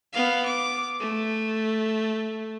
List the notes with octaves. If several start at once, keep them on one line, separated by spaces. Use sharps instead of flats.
B3 F5
D6
A3